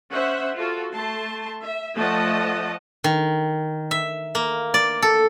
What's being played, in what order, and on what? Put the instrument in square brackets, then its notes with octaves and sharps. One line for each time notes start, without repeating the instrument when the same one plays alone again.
[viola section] C#4 C5 E5 F#5
F4 F#4 A4
A3 A5 C6
E5
F3 A3 D5 D#5 F#5 A5
[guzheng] D#3
E5
A#3
D5
A4